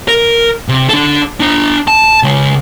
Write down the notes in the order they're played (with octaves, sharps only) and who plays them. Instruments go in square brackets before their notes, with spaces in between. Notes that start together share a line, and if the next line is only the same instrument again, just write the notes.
[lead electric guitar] A#4
C3
D4 A4
D4 A#5
A5
C#3 G#3